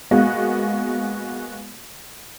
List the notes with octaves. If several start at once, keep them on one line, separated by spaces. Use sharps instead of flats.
G#3 A#3 B3 F#4